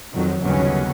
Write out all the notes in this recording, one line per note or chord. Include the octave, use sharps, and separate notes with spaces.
F2 D#3 F#3
G1 D#2 C#3 F#3 B3 C#4